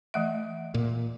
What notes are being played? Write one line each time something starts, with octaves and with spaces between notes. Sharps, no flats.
E3 A3 E5
A#2